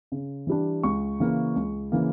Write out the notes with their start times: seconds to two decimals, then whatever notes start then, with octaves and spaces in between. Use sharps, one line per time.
0.12 C#3
0.47 E3 G3 D4
0.83 C#2 C#6
1.20 C#3 E3 A#3
1.56 C#2
1.92 C#3 E3 A#3